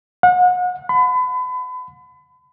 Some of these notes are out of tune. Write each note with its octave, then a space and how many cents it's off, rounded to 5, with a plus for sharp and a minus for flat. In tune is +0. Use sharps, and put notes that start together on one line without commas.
F#5 -35
B5 +35